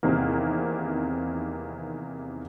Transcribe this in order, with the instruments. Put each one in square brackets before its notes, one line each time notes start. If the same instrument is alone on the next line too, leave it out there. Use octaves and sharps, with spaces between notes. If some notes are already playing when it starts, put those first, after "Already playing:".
[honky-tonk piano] E2 C3 D#3 A#3